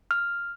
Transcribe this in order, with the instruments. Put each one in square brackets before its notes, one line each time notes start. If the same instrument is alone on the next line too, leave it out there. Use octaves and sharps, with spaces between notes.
[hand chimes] F6